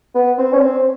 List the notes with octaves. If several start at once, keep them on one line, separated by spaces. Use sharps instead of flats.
B3
C4
C#4
C4